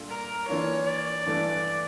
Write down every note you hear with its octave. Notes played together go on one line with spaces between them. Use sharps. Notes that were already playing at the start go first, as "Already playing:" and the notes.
Already playing: A#2 G3 D4 F4 A4
A#4
E3 A#3 D4 F4 C#5
D5
G2 E3 A3 D4